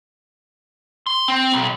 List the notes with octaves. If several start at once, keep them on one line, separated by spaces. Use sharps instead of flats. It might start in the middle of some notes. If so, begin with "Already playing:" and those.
C6
C4
B1